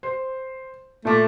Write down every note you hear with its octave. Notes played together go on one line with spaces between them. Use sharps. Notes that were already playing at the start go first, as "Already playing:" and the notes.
C5
A#2 A3 D6